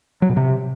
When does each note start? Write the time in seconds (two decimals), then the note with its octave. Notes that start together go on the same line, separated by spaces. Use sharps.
0.22 F#3
0.29 B2
0.37 C3